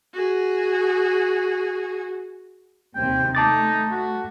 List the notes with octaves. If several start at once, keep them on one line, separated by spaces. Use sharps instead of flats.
F#4 G#4
D#2 C3 C4 G5
A3 D#4 A5 D6 A6
F#4